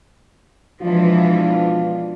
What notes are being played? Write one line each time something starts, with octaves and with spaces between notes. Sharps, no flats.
B2 E3 F3 G#3 D4 F4